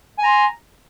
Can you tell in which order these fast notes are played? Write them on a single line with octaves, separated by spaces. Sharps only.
G#5 A#5 C6